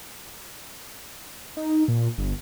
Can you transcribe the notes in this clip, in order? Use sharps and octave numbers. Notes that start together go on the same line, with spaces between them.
D#4
A#2
G1